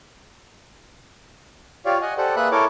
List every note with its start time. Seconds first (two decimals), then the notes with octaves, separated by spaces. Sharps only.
1.86 F4 G4 C#5 D5 F5
2.02 D#5 F#5 G#5
2.18 G4 A4 C5 D5 F#5
2.36 A#3 G#4 B4 E5 B5 F#6
2.52 E4 A4 A#4 C#5 D6